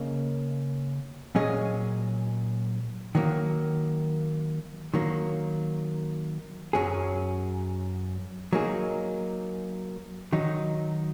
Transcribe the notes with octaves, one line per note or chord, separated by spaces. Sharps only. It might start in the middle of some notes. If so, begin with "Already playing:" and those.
Already playing: C#3 A#3 C#4 A#4 D#5
A#2 F#3 C#4 G#4 D#5
D#3 F#3 A#3
D#3 F#3 A#3
F#2 F#3 C#4 G#4
F#3 A#3 D#4 G#4
D#3 F#3 D#4